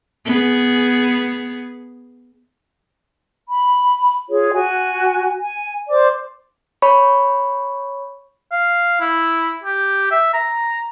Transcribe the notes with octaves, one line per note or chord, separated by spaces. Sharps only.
B3 G#4
B5
F4 G#4 C#5
F#4 G#5
G#5
C5 D5 D6
C#5 B5 C#6
F5
E4
G4
E5
A#5